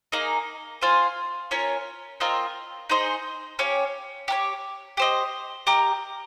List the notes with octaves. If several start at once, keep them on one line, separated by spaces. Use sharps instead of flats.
A#3 D#4 G#4 D#5
F4 C5 F5 G#5
C#4 F4 A#4 C#5
C4 F4 A#4 D#5
D#4 G#4 C5 D#5
C#4 G4 C#5 F5
G4 A#4 C#5
G4 C5 D#5
G4 A#4 D#5